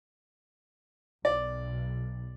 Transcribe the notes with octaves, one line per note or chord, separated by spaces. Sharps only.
B1 D5